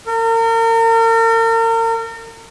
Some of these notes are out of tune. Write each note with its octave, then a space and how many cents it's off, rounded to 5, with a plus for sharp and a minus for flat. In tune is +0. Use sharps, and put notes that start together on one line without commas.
A#4 -40